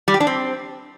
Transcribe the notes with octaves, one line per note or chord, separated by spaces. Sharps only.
G3
G4
D4
C4